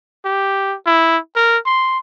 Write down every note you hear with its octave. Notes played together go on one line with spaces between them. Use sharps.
G4
E4
A#4
C6